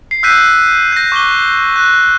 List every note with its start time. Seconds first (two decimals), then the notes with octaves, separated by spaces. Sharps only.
0.11 C7
0.23 E6 F#6 G6 B6 C7 D#7
0.92 G6 A#6
1.12 C#6 D6 F#6 D#7 G7
1.76 F#6